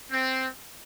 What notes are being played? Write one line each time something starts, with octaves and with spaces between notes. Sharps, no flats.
C4